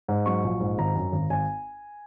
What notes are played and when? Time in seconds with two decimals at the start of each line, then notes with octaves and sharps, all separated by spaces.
0.08 G#2
0.26 F#3 C#6
0.44 A#1
0.60 G#2
0.78 G#1 A#5
0.95 F#2
1.12 G#1
1.30 G#1 G#5